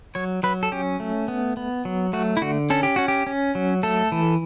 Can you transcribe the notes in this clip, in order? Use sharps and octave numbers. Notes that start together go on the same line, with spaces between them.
F#3 C#5
F#3 B4
A4
C#4 G4
A3
B3
B3
F#3
A3 F#4
E4
D3 F#4
C#4 A4
G4
C#4 F#4
G4
C#4
F#3
A3 A4
E3